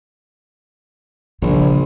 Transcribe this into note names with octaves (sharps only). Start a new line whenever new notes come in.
A#1 C#3 G3